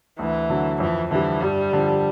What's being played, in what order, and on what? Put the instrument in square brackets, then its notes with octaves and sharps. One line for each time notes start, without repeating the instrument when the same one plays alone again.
[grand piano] D2 [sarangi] E3
[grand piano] D3 F#3
[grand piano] F2 [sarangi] E3
[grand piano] D3 G3 [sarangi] E3
[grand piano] G2 [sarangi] G3
[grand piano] D3 F3